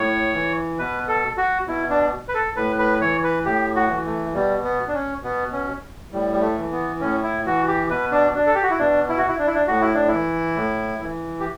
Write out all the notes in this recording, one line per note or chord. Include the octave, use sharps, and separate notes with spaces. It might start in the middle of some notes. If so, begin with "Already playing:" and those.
Already playing: A2 C#5
E3
B2 B4
A4
F#4
B2 E4
D4
B4
A4
A2 B4
B4
E3 C#5
B4
A2 G4
F#4
E3
A3
B2 G3
B3
D4
C#4
B2 B3
C#4
A2 G3
G3
A3
E3
B3
A2 C#4
E4
E3 F#4
G4
B2 B4
D4
D4
A4
G4
F#4
E4
B2 D4
E4
F#4
E4
D4
E4
D4
A2 F#4
E4
D4
E3 E4
A2
E3
G4